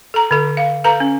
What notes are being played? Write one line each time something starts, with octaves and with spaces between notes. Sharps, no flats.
A4 A#5
D3 A4
F5
A4 B4 F5 A#5
C#4